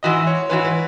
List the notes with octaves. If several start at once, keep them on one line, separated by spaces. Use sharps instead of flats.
G#2 E3 F#4 D#5
C#5
G#2 E3 F#4 B4
B4